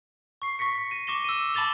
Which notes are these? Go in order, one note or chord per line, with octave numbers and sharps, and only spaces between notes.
C#6 C7
C#6 A#6 B6 C#7
A#6 D#7
C#6 D6 A#6 E7 G7
E6 D#7
A5 B5 D6 A6 F7 G7